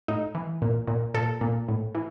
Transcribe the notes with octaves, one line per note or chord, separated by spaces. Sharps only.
A2 D#4
E3
A#2
A#2
A#2 A4
A#2
A2
E3